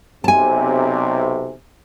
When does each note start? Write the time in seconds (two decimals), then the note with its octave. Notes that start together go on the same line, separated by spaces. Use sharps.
0.24 B1 C3 G#5 A5